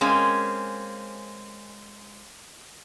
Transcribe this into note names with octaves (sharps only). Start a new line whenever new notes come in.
G#3 A#3 C4 C#4